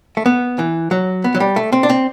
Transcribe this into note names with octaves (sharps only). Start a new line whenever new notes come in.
A3
B3
E3
F#3
B3
F#3
G3
A3
C4
D4
C4